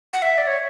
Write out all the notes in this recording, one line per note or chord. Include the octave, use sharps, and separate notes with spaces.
F#5
E5
D5
C#5